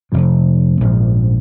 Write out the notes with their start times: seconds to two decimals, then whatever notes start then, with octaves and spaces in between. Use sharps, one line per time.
0.12 F1 F2 C3
0.81 A#1 G#2 F3